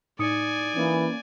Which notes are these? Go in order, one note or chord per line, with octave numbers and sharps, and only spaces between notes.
A2 D#4 D5 G#5 D#6 C#7
E3 A#3 C#4